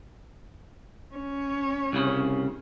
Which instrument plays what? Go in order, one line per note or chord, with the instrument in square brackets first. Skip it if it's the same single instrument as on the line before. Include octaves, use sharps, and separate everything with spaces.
[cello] C#4 C#5
[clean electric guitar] C2 C#3